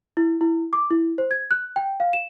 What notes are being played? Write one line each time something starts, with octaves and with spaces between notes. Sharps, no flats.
E4
E4
D6
E4
C5
G#6
F#6
G5
F5
E7